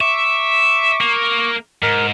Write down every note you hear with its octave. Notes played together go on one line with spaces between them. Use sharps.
E5 C#6 D6
A#3
G#2 A#4 F6